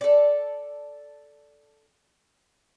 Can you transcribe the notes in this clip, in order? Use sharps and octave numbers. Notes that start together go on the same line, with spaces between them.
A4 D5